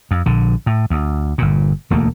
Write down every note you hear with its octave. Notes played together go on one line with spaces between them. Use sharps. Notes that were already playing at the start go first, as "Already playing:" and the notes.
F2
A#1 D3
A2
D2
G1 A#2
E1 D2 A3 A#3